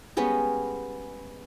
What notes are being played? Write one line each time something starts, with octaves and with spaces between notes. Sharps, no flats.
G3 G#3 B3 C#4